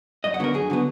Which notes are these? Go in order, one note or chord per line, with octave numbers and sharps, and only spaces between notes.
F#2 D#5
F#5
D3 F#3 B3 A#4
F#2 G#4
D3 F#3 B3